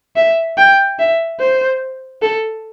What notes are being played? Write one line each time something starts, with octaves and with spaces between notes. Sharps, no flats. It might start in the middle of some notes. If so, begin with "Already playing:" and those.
E5
G5
E5
C5
A4